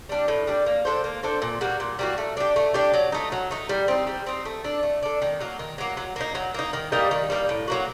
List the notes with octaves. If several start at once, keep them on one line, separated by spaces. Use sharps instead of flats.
G3 D4
A2
G3 D4
A#3
D4 A4 C5
A#3
D4 A4 C5
A#2
G3 A#3 F#4
A#2
G3 A#3 F#4
A3
D4 G4
A3
D4 G4
F#3
A3 D#4
F#3
A3 D#4
G3
C4 D#4
G3
C4 D#4
A3
D4 A4
A3
D4 A4
D#3
F#3 A#3
D#3
F#3 A#3
F#3
A#3 D#4
F#3
A#3 D#4
D#3
G3 A#3 D#4
D#3
G3 A#3 D#4
A2
F#3 A#3 F#4